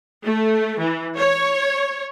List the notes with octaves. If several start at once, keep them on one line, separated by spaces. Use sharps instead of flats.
A3
E3
C#5